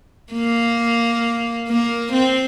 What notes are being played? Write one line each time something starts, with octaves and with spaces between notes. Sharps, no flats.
A#3
A#3
C4